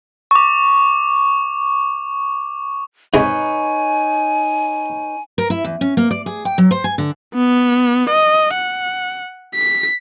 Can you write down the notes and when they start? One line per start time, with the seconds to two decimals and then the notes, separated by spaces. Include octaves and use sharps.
0.31 C#6 D6
3.14 G#2 C3 G#3 D#4 B4 C#5 G#5
5.38 A#4
5.50 E4
5.64 E2
5.81 C#4
5.97 A#3
6.11 D5
6.26 G#4
6.45 G5
6.58 F#3
6.71 C5
6.84 G#5
6.98 D3
7.34 B3
8.09 D#5
8.54 F#5
9.55 B6